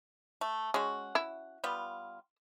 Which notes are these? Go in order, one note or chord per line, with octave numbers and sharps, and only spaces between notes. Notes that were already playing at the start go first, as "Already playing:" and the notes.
A3
G#3 C#4 F#4
E4
G3 B3 F4